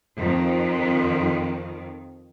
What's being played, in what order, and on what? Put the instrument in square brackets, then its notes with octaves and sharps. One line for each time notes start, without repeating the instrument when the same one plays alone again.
[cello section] F2 D#3